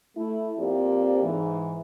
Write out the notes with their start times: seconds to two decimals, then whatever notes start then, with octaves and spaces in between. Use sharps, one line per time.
0.16 A3 E4
0.58 F2 F3 A#3 C4 G4 D5
1.22 G#2 E3